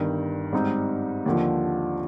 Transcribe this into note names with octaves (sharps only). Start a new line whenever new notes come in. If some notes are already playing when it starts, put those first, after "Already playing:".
Already playing: G1 G2 D#3
G#2 G3 C4 D#4
D#2 D3 F3